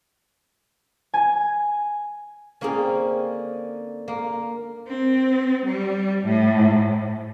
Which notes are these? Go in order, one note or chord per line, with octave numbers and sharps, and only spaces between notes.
G#5
D3 A#3 C4 C#4 G#4
A#3
C4
G3
A2